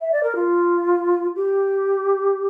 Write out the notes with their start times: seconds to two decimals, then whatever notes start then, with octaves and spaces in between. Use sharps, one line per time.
0.01 E5
0.12 D5
0.23 A#4
0.35 F4
1.36 G4